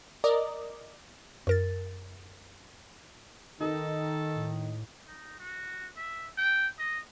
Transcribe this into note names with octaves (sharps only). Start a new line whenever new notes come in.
A#4 D5 D#5
F#2 A#4 A6
D#3 D#4 A4
A2
D#4
F#4
E5
G5
D#5